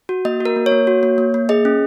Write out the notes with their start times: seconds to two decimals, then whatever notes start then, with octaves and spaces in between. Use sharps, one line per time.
0.09 F#4
0.25 A#3 D#5
0.40 F#4
0.45 A#4
0.56 A#3
0.66 C#5
0.72 A#3
0.87 F#4
1.03 A#3
1.18 A#3
1.34 A#3
1.49 G#4 D#5
1.65 C#4